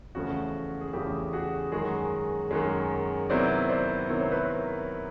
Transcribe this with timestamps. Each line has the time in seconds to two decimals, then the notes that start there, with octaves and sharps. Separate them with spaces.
0.15 E2 C#3 F3 A3 F#4
0.81 G#4
0.93 E2 C#3 F3 A3 G4
1.33 F#4 G#4
1.72 F#2 D#3 G#3 F#4 G#4
2.51 F#2 D#3 G#3
3.30 C3 D#3 F#3 B3 E4 C5 D5
3.69 C5 D5
4.09 C3 D#3 F#3 B3 E4 C#5
4.20 C5
4.32 B4
4.43 A#4 C5